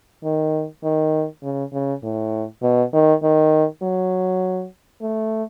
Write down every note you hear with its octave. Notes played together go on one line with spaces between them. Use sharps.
D#3
D#3
C#3
C#3
A2
B2
D#3
D#3
F#3
A3